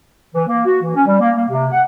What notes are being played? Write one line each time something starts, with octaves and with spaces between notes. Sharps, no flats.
E3
A#3
F#4
E3
C#4
G3
A#3
A#3
C3
F#5